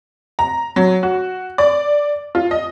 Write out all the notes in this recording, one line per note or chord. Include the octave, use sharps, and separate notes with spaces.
A#5
F#3
F#4
D5
F4
D#5